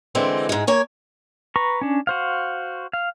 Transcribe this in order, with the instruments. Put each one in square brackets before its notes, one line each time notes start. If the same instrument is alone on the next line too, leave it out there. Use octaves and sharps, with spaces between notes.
[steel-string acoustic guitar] D3 E3 G#3 C4
G#2 G#3
A#3 C#5 G#5
[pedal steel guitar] B4 A#5 C#6
C#4 D4
F#4 C5 F5
F5